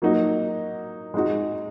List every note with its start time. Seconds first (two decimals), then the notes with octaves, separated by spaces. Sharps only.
0.02 F#3 A#3 D#4 F#4
1.14 G#3 D#4 F#4